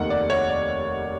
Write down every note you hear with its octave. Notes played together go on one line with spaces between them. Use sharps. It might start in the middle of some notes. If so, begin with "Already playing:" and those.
Already playing: F1 D#2 D#3 F#5
D5
C#5
D5